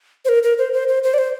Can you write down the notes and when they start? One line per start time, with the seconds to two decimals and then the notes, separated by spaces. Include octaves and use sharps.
0.25 C5
0.29 A#4
0.43 A#4
0.58 C5
0.73 C5
0.88 C5
1.03 C5
1.14 D5
1.18 C5